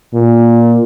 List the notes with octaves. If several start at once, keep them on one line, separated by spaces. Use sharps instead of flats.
A#2